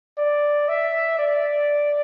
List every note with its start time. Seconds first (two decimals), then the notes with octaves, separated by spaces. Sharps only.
0.18 D5
0.69 E5
1.19 D5